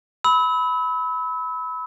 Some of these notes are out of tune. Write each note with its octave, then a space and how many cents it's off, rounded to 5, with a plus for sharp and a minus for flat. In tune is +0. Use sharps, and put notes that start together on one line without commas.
B5 +10 E6 -35